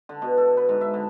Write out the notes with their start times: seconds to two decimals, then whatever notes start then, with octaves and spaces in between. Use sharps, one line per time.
0.09 D3
0.22 B2
0.37 A4
0.57 B4
0.69 G#2
0.81 E5
0.94 D3